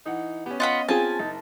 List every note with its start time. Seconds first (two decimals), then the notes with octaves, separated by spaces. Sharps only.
0.06 E3 D#4 F#5
0.46 B3 C#4 G4
0.60 F4 D#5 F#5 B5
0.88 C4 F4 G#4 G#5 A5
1.19 F#1 D#4